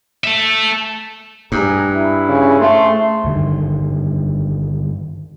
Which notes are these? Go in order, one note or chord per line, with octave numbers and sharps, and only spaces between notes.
A4 E5
G2 G#4 A#5
E4
C#3
A3 C4 C6
G2 D3 D#3